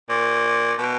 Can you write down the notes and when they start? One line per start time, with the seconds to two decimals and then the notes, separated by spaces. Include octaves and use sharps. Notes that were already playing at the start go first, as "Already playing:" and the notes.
0.09 A#2
0.79 B2